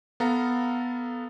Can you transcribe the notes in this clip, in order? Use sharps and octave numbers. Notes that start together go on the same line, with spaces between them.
B3 A4 F5 A#5